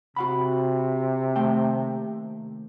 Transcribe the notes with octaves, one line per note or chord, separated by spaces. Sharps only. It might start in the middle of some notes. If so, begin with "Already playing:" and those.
C3 F#4 F#5 B5
D#2 A3 G5